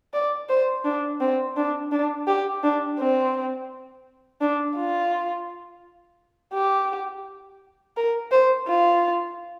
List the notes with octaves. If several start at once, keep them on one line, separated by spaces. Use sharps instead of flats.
D5
C5
D4
C4
D4
D4
G4
D4
C4
D4
F4
G4
A#4
C5
F4